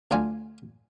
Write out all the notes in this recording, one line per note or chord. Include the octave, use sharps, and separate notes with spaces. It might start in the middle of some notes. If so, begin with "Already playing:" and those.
D2 D4 F4 G#5